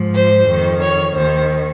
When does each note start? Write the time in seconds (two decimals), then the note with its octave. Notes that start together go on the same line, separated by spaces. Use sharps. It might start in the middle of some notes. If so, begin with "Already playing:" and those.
Already playing: G#2 F3
0.14 C5
0.48 F2 D#3
0.82 C#5
1.15 D#2 D#3 C5